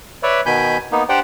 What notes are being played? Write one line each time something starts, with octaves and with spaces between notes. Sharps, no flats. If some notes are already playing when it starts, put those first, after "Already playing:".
B4 C#5 D5 E5
B2 D#3 G#5 B5 G6
A#3 B3 D#4
D4 G4 C5 D5 F#5 G5